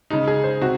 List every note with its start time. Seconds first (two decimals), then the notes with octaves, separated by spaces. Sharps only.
0.10 C#3 G#3 D#4
0.28 G#4
0.44 C5
0.61 C3 F#4